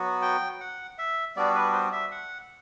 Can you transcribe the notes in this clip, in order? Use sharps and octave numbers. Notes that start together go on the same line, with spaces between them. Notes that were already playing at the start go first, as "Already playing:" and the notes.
Already playing: F#3 B3 F#4
G5
F#5
E5
G3 B3 D4 F#4 D5
B4
C5
E5
F#5